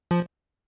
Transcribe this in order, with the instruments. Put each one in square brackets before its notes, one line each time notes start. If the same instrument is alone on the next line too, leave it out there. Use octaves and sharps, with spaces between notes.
[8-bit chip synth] F3